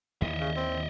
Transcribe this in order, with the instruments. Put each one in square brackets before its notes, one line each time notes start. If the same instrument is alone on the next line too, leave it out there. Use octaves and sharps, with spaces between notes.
[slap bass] D#2 D#3 E3 [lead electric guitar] D#5 E5
[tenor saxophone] C#3
C4